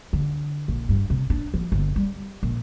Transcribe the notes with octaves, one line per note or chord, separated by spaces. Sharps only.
D3
A#1
G2
C3
D4
F3
G1
G3
A#1